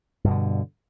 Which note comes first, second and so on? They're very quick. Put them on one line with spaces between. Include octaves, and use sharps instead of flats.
G2 B2 D3